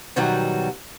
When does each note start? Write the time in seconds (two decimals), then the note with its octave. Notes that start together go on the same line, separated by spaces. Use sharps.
0.16 B2 D#3 F#3 G3 F#4